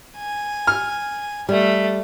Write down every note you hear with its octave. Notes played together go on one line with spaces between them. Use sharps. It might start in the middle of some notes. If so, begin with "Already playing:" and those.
G#5
F6
G3 A3